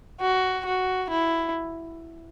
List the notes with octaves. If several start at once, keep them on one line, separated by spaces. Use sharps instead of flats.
F#4
F#4
E4